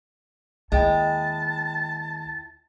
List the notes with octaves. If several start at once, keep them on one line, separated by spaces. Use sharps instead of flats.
D#2 G#3 E4 G5 A5